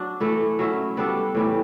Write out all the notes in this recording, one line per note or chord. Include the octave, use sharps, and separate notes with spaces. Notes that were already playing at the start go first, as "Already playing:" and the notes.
Already playing: F#3 D4
E3 A3 E4 A4
F#3 C#4 E4
G3 B3 D4 A4
A2 E3 G3